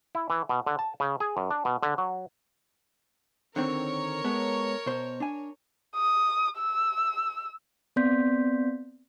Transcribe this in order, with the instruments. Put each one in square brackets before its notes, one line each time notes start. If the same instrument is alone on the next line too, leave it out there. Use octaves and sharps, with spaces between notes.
[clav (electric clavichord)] E4
E3
B2
D3
A5
C#3
G#4
F#2
D4
B2
D3
F#3
[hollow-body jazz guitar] D3 D#3 C4 [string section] A#4 C#5
[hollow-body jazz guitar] G#3 B3 A4
B2 C5
D4 G#5
[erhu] D#6
E6
[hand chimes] B3 C4 D5 C6 G6 B6